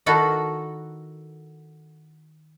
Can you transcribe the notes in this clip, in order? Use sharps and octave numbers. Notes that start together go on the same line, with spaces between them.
D#3 E4 F#4 A4 A#4